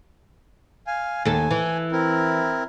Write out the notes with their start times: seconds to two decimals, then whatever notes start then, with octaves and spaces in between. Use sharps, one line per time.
0.87 F5 G#5
1.25 D#2 A4 G#5
1.51 E3
1.92 C4 E4 A#4